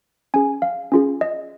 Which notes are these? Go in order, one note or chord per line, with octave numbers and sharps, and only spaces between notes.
C#4 G#4 G#5
F5
C#4 F4 G#4
D#5